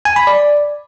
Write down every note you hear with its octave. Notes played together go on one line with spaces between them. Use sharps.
G#5
B5
D5